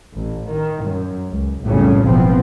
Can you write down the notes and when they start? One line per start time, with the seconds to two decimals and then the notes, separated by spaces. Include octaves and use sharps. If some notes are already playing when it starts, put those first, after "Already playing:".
0.13 A1
0.49 D#3
0.84 F#2
1.32 C#2
1.64 B1 F2 A2 C#3 G3 A3
2.05 F#1 B1 F3 B3 C4